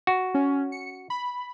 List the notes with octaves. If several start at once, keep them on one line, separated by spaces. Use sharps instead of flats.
F#4
C#4
C#7
B5